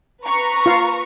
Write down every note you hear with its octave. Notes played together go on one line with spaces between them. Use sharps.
B4 A#5 C#6
F4 F5